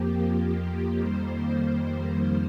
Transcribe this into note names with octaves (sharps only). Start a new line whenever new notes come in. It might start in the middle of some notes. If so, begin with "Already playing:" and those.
Already playing: F2 F3 A#3 G4
F2 D#3 G3 A#3 C5